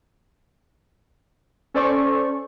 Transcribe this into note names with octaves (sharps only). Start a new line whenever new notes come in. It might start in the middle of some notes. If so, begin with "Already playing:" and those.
C#4 A4 C5 D5 C#6